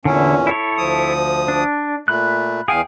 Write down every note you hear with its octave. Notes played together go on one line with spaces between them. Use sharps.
E2 A#2 D3 C#4 E4
E4 A4 C#5
D2 F3 D#6
D4
A#2 A3 B5 F#6
E2 G#4 F5 G5 G#5